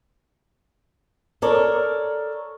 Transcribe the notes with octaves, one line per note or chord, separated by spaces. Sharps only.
A4 A#4 C#5 D5